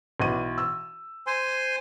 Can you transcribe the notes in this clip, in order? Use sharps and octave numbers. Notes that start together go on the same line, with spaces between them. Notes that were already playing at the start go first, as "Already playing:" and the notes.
B1 E3 D#7
E6
C5 G#5 C6